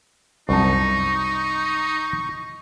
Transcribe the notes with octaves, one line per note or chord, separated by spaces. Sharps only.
C2 F#2 D#4 A5 C#6